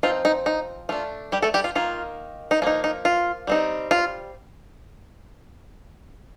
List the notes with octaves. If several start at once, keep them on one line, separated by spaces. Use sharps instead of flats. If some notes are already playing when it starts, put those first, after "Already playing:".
F3 C4 D#4 F4
D#4
D#4
A3 D4 F4
G3 G4
A3 A4
G3 G4
F4
D#3 A#3 D#4 F4
D#4
F3 A#3 D#4 F4
D#4
F4
G3 C4 D#4
F4